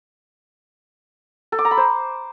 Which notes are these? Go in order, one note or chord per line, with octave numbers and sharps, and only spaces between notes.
A4
D6
A#5
B5
C5